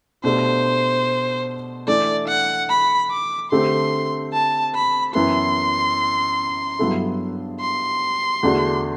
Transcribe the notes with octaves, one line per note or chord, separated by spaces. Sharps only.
B2 A3 D4 G4 C5
E3 A3 D4 D5
F#5
B5
D6
D3 A3 C4 G4 C6
A5
B5
F#2 E3 B3 E4 B4 C6
G2 F#3 B3 E4 A4
C6
E2 D3 A3 D4 F#4